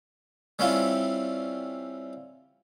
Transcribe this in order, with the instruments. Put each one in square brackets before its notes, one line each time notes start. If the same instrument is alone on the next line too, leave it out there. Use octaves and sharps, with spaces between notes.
[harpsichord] G3 C4 C#4 E4 F4